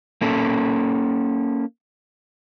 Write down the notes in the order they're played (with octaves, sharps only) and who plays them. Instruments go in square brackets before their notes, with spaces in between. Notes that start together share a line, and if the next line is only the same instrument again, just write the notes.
[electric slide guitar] A#3 C#4 A4